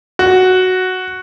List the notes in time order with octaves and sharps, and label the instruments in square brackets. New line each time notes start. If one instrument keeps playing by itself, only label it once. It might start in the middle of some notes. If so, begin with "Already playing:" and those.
[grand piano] F#4